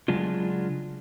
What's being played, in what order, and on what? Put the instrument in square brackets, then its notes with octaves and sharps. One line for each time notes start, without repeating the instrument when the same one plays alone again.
[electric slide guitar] C#3 F#3 G#3 D4 F4